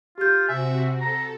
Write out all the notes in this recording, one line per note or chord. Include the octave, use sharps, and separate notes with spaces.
F4 G4 G6
C3 C4 F#4 E5 G#5
A4 A#5